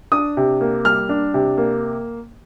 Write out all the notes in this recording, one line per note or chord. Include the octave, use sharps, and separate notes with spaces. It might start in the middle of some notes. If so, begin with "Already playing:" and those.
D4 D#6
C3
A#3
G3 F6
D4
C3
A#3